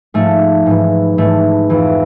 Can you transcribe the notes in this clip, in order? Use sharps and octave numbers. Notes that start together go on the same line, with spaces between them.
G#2 F3 A3
G#2 E3
G#2 E3 A3
F2 E3